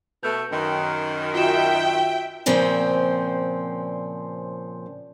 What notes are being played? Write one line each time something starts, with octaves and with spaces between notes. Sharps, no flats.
B2 A3 G6
F#2 D#3
F4 F#4 E5 G5 E7
A#2 C#3 F3 C4